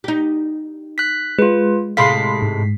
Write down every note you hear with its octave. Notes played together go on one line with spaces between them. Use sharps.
D#4 G4
F#6 B6
G#3 F4 B4
A2 C3 G#3 F5 B5 C6 B6 C7
G#2